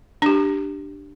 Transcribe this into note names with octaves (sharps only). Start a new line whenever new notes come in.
D4 G4